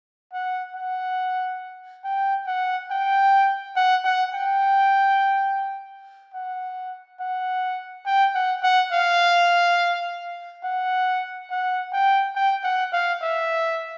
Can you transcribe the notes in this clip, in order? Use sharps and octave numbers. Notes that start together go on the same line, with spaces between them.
F#5
F#5
G5
F#5
G5
F#5
F#5
G5
F#5
F#5
G5
F#5
F#5
F5
F#5
F#5
G5
G5
F#5
F5
E5